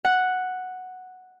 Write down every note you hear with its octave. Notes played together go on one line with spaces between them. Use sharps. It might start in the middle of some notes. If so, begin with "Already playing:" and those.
F#5